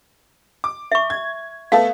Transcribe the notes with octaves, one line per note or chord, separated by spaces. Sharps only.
D6
E5 C#6
G#6
A3 B3 A4 F5